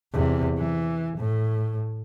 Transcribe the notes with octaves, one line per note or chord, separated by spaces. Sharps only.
E2 C3
E3
A2